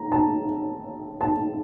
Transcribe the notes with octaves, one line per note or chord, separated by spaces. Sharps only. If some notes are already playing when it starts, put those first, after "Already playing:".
Already playing: A#5
A5
A5